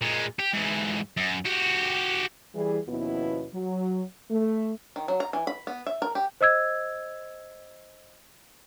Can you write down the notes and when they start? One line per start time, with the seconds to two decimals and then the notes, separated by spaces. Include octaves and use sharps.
0.02 A#2 G#3
0.39 G4
0.53 G#2 E3
1.17 F#2
1.46 F#4 G4
2.54 E3 G3 G#4
2.87 D#2 B2 F3 B3 C#4 E4
3.54 F#3
4.31 A3
4.96 D#3
5.08 F#3
5.20 A#5
5.33 E3
5.47 B5
5.67 B3
5.87 E5
6.02 A#4
6.15 G4
6.41 C5 D#5 E6 G#6